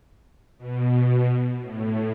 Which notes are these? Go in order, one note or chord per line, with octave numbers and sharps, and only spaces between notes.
B2
A2